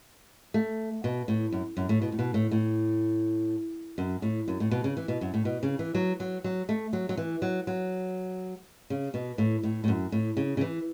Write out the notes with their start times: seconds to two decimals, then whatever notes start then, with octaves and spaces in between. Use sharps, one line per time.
0.54 A3
1.04 B2
1.28 A2
1.52 F#2
1.77 F#2
1.89 A2
2.02 B2
2.12 A2
2.19 B2
2.34 A2
2.51 A2
3.98 F#2
4.22 A2
4.48 F#2
4.60 A2
4.71 B2
4.84 C#3
4.97 E3
5.08 B2
5.21 F#2
5.34 A2
5.45 B2
5.63 C#3
5.79 E3
5.95 F#3
6.20 F#3
6.44 F#3
6.69 A3
6.93 F#3
7.09 F#3
7.17 E3
7.42 F#3
7.67 F#3
8.90 C#3
9.14 B2
9.38 A2
9.64 A2
9.84 A2
9.88 F#2
10.12 A2
10.37 C#3
10.57 C#3
10.61 E3